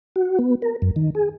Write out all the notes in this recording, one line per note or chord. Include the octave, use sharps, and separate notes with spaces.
F#4
B3
A#4
F#2
D#3
G#4